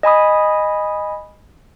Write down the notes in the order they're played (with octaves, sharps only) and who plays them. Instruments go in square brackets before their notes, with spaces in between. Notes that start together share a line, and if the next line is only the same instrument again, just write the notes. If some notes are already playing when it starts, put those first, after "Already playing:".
[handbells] D#5 G#5 B5 D#6